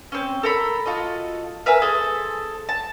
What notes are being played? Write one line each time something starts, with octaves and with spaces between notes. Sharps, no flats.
C4 C#4
A4 A#4 A#5 B5
F4 F#4 A4 D#5
A#4 B4 E5 G#5
G#4 A4 C5
A5